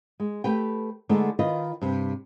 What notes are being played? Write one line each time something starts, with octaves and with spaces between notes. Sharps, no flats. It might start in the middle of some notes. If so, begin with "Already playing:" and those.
G#3
A3 G4 B4 G5
D3 G#3 A3 B3 D#4
D#3 F4 B4 D#5
G2 C3